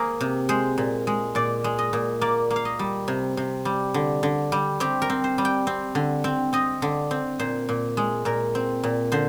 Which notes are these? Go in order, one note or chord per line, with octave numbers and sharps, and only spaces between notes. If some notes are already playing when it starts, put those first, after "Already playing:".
Already playing: A#3 G#4 A#4 C5
C3
G#3 C5
A#2
G#3
A#2 D5
G#3
D#5
A#2
A#3 D5
A#3
F5
D#5
G3
C3
C3
G3
D3
D3
G3
C4 G4
A#4
C4
C5
G3
G5
C4
D3
C4
C4 D#5
D3
C4
A#2 C5
A#2
G#3
A#2 A#4
C4
A#2
D3 C5